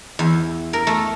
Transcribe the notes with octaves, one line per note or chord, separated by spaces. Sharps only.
E2
A#4
A3